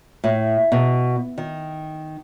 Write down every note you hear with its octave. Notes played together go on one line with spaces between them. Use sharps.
A2
B2
D#3